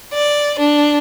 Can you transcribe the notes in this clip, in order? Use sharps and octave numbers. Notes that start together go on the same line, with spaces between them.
D5
D4